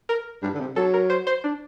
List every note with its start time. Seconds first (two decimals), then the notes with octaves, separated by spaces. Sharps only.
0.09 A#4
0.42 G2
0.54 D3
0.60 C3
0.76 F#3 A4
0.94 A#4
1.10 C5
1.27 C5
1.44 D4